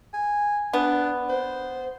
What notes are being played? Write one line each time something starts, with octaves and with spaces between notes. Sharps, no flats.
G#5
B3 D4
C5